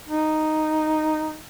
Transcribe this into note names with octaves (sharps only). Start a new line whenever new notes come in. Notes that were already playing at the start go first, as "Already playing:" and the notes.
D#4